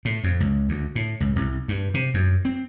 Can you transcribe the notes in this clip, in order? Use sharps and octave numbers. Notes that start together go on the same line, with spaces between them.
A2
F2
C#2
D2
A2
C#2
C2
G2
C3
F#2
C4